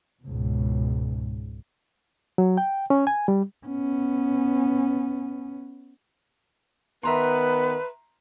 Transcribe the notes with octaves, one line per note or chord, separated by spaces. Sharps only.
C#2 G#2 B2
F#3
G5
C#4
G#5
G3
B3 C#4
D#3 B3 B4 E5 A#5 C6